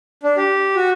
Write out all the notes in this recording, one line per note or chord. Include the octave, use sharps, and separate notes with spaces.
D4
G4
F#4